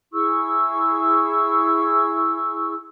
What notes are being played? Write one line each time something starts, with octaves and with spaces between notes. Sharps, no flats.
E4 G#4 C#6 E6